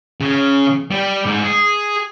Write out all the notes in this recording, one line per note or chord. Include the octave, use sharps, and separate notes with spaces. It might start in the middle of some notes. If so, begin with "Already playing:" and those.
C#3
G3
G#2
G#4